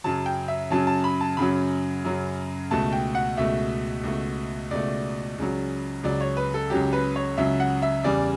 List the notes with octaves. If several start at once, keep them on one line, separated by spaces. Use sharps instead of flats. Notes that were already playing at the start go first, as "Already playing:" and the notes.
F#2 C#3 F#3 A5
G5
E5
F#2 C#3 F#3 A5
A5
B5
A5
F#2 C#3 F#3 B5
F#2 C#3 F#3
C#2 B2 A3 A5
G5
F#5
C#2 B2 A3 E5
C#2 B2 A3
C#2 B2 A3 D5
C#2 C#3 F#3
C#2 C#3 F#3 D5
C#5
B4
A4
C#2 C#3 F#3 G4
B4
C#5
C#2 C#3 F#3 E5
F#5
E5
E2 C#3 G3 D5